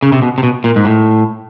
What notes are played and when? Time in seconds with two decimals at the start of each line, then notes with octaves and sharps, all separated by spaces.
0.02 C#3
0.12 C3
0.22 B2
0.38 C3
0.43 B2
0.64 A#2
0.76 G#2
0.85 A2